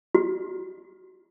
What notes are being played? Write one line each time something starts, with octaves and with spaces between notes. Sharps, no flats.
F#4